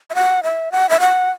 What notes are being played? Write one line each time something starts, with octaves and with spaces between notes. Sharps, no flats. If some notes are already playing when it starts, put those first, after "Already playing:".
E5
F#5
E5
F#5
E5
F#5